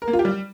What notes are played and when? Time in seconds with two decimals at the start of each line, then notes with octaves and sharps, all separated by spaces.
0.02 A#4
0.08 A#3
0.13 F4
0.19 G4
0.25 G3